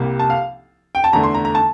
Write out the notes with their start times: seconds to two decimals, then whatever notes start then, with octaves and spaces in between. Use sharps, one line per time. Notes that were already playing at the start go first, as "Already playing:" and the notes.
Already playing: C2 C3 G3 A#3
0.19 A5
0.30 F5
0.95 G5
1.04 A5
1.13 E2 D3 A3 A#5
1.23 C6
1.34 A#5
1.45 A#5
1.55 A5